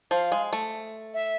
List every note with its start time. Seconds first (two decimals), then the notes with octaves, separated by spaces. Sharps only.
0.11 F3 F5
0.32 G#3
0.53 A3
1.14 E5